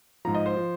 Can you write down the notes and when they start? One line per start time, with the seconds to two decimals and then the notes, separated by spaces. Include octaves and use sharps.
0.25 G#2 F3 A#5
0.35 D#5
0.46 C5
0.57 F3